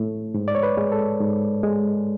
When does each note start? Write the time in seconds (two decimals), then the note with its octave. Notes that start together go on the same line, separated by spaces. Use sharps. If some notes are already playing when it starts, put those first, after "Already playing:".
Already playing: A2 A3
0.34 G#2
0.48 D5
0.55 C#5
0.63 B4
0.77 G#3
0.92 A4
1.20 G#2
1.63 G#3